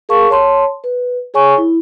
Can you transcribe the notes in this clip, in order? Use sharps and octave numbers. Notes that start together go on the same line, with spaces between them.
G#4 A#4 F5 A5 C#6
C#5 A5 C6
B4
G#4 C#5 G#5 C#6
E4